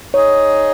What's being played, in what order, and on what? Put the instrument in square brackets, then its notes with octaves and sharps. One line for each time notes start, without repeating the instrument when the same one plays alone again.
[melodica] D#4 G#4 D#5 [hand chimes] C#5